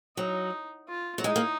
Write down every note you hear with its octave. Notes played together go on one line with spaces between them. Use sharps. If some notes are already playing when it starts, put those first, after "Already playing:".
F#3 D#4
F4
F#3
G#3 D#4
A#3